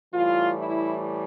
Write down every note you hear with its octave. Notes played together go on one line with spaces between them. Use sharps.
A2 E3 G3 F4
E4